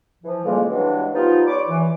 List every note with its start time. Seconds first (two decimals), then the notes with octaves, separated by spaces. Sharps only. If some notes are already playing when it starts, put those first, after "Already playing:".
0.24 E3 F3
0.45 F2 C#3 E3 G3 G#3 A#3
0.70 G2 E3 F#3 G#3 D4
1.13 F3 G3 B3 D#4 F4
1.48 C#5 D5 B5 D6
1.68 E3